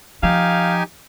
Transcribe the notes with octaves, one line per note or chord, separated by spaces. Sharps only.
F3 D#4 G4 F5 G#5